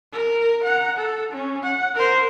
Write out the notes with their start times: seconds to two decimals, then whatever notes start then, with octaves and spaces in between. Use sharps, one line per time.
0.13 A#4
0.64 F#5 A#5
0.97 A4
1.32 C#4
1.63 F#5
1.95 A#4 C5